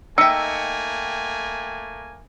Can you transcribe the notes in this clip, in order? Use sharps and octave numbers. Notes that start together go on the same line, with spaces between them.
A3 A#3 D#4 E5 G5 G#5 E6 C#7